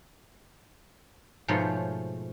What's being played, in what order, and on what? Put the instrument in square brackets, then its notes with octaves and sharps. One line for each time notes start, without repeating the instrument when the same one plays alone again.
[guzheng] G#2 B2 F3 A3 C#5 C6